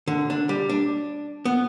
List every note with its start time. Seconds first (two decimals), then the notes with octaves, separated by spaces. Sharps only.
0.08 D3
0.30 D4
0.49 G3
0.69 D4
1.45 B3